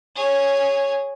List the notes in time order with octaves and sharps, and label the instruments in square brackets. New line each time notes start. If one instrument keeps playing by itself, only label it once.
[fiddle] G#4 C#5